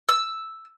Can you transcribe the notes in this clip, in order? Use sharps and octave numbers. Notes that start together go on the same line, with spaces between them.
E6